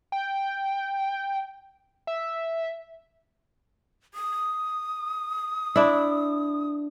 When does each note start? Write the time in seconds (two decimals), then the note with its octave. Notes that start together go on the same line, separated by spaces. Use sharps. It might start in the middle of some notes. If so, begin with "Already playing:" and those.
0.12 G5
2.07 E5
4.14 D#6
5.76 D4 E4